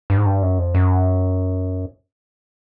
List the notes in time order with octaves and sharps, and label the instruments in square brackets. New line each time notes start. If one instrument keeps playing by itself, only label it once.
[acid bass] G2
G#2
G2
F#2
F2
F#2